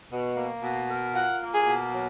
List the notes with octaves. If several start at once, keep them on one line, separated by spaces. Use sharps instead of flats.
B2
A#3
B2
A#4
F4 F#5
A#3
G#4
B2
F#3